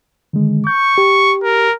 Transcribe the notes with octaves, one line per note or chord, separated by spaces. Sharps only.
D3 D#3 G#3
C#6 G6
G4
A#4